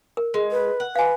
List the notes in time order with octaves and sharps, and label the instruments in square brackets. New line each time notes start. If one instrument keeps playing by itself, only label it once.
[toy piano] A#4
[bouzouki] G#3
[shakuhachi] B4
[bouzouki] F#5
[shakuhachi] B4 [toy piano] F5 G#5